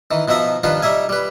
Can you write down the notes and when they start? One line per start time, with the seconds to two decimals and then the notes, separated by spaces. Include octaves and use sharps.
0.11 D#3 E3
0.28 B2 F3 D#4 E5 A#5
0.63 G2 D#3 F3 F4 B4 F5
0.82 G3 D#4 E5 G#5
1.09 G3 B4